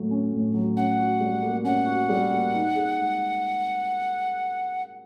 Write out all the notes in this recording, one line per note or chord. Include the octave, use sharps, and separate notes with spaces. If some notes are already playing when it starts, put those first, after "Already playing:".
Already playing: A2 F#3 A3
C#4
A2
F#3
C#4 F#5
F#4
G3
A#3
C#4 F#5
F#4
G3
A#3
D#4
G#4
G#3